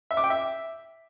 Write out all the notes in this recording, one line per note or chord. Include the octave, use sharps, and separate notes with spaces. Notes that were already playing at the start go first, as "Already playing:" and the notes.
E5
D6
G5
E5